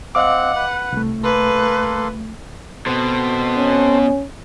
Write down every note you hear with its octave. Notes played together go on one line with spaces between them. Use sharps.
C4 D#5 F5 F#5 D6
B4
C2 A3
A#3 A4 B4 C6
B2 B3 C4 A4 C5
C#4